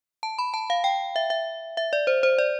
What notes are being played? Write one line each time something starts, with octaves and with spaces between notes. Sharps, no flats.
A5
B5
A5
F5
G5
E5
E5
E5
D5
C5
C5
D5